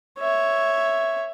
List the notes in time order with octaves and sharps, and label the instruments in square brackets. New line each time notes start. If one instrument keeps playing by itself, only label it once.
[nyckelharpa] C#5 E5